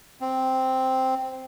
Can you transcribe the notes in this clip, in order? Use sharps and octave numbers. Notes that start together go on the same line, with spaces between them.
C4